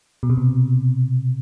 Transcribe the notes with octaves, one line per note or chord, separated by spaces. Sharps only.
B2
C3
B2